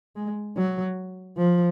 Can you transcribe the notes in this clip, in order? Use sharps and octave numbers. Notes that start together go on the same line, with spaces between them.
G#3
F#3
F3